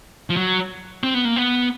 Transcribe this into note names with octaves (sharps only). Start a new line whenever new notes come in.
F3
F#3
C4
B3
A#3
B3